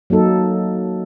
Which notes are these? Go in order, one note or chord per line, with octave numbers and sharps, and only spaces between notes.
F#3 A#3 D#4 A4